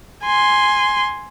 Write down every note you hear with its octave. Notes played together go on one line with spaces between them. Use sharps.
G#5 C6